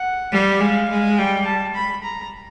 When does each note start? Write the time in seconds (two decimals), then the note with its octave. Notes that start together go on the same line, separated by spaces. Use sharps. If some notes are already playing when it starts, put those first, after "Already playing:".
Already playing: F#5
0.31 G3
0.60 G#3 F5
0.89 G#3
1.17 G3 G5
1.45 A5
1.74 B5
2.03 A#5